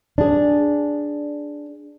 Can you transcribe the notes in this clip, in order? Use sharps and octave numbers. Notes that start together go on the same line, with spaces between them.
D4 G#4